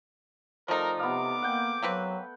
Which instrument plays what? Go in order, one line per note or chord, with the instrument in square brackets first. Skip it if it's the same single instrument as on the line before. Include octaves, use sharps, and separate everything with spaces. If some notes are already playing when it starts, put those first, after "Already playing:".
[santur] F3 A3 [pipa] G3 D#4 [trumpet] A#4
[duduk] C3 [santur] B3 F5 [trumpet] D6
[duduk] A#3 [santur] F#5 G5
[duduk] F#3 [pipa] A#3 C4 B4